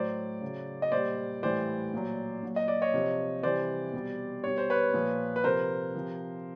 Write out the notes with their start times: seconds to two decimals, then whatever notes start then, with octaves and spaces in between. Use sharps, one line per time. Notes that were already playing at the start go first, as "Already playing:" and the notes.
Already playing: A2 F#3 C5 D5
0.42 C#3 F#3
0.82 D#5
0.92 A#2 G3 C5 D5
1.43 A2 E3 G3 C5 D5
1.93 A#2 F#3
2.43 A#2 F#3
2.56 D#5
2.68 D5
2.82 C#5 D#5
2.94 C3 F3
3.43 C3 E3 G3 C5 D5
3.93 B2 G3
4.43 B2 G3 C#5
4.58 C5
4.70 B4 C#5
4.94 A#2 F3
5.36 B4
5.44 C3 F3 A#4 C5
5.95 C3 F3